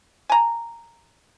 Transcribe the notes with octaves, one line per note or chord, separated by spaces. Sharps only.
G#5 A#5